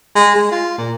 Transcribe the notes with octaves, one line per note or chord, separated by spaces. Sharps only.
G#3
G#3
F4
A#2